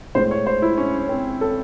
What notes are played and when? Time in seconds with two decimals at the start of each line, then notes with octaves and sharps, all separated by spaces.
0.15 A2 G#3 C5
0.31 C#5
0.47 C5
0.62 E4
0.78 C#4
0.98 C#4
1.09 C4
1.41 A4